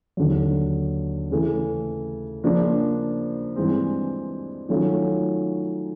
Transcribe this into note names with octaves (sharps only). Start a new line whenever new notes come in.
D#2 D3 F#3
C#3 E3 A3
C#3 F3 A#3 D4
G2 E3 G#3 C4
D#3 F#3 A3 C#4 F4